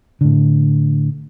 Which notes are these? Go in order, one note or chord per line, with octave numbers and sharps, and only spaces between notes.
A2 D3